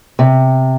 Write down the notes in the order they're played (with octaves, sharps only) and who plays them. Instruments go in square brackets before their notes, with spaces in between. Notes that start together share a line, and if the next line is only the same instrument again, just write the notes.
[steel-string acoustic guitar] C3